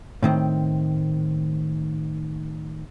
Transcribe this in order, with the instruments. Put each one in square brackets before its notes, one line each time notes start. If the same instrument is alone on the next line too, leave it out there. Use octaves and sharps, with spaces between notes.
[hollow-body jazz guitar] A2 D#3 C4